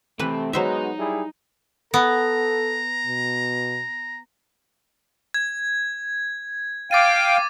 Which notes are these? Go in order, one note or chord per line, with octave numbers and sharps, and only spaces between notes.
C3 E3 A3 C4 B4
F#3 G#3 B3 D#4 F#4 C5 E5 A#5
G3 E4 G#4
B3 A4 A#5
B2
G#6
F5 G5 D6 A6 D#7